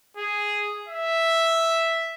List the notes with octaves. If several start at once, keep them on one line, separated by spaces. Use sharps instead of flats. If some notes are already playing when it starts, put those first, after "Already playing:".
G#4
E5